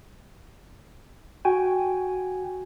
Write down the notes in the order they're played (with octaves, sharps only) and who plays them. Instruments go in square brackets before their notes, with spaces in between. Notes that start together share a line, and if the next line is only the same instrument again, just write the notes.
[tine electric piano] F#4 G5 G#5